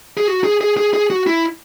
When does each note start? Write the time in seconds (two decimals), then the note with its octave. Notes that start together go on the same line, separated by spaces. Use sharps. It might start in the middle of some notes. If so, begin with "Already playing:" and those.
0.17 G#4
0.28 F#4
0.44 G#4
0.61 G#4
0.77 G#4
0.94 G#4
1.10 F#4
1.27 E4